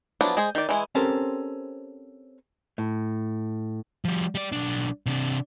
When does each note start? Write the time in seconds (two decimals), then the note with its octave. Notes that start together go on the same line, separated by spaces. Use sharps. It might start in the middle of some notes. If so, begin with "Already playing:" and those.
0.21 F3 F#3 B3 D4 E4
0.37 G#3 G#4 C5
0.55 D#3 D5
0.69 E3 G#3 E4
0.95 C4 C#4 G4 A4 A#4 C5
2.78 A2
4.05 F3 G3
4.35 G3 D5
4.52 B1 D4
5.06 C3 D4